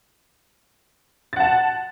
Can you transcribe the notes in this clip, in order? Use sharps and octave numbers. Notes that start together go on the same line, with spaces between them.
F#5 A5 A6